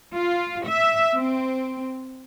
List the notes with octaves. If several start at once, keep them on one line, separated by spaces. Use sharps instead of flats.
F4
E5
C4